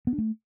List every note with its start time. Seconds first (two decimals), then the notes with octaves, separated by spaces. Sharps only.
0.07 B3
0.13 D4
0.18 A3